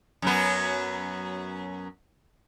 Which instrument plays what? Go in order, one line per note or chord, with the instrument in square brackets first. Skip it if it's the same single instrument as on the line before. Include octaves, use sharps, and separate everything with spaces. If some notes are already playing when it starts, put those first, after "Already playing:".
[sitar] F#2 F#3 B3